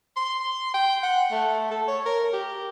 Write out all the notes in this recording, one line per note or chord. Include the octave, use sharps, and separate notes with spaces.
C6
G5
F#5
A3
A4
C#5
A#4
G4